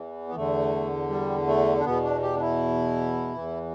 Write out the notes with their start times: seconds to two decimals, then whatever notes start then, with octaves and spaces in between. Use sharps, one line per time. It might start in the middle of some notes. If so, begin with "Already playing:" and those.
Already playing: E2 E3
0.29 B3
0.35 E2 D3 A3
1.10 G3
1.47 A3
1.80 D4
1.85 E2 B2 B3
2.04 D4
2.22 G4
2.36 D4
2.41 E4
3.35 E2 E3